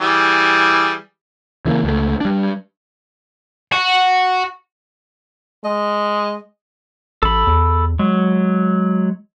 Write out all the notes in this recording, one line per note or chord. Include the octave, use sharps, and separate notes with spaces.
E3 G3 G#4
C#3 E3 A3 A#3
C#2 A3
G3 D4
F#4
G#3 D#5
A1 A4 B5
E2
F#3 G#3